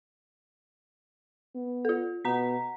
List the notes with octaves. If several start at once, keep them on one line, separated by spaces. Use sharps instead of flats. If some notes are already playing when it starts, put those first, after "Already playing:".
B3
F4 A4
B2 F#5 A#5 B6